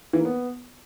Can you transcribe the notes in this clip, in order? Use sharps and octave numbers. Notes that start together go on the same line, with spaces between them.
E3
A#3
B3